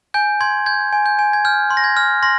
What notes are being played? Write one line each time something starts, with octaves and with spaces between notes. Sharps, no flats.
G#5 G6
C6 G#6
G6 G#6
G#5
G6
G#5
G#6
F6 G6
C6
A#6
G#6
F6
C6 A#6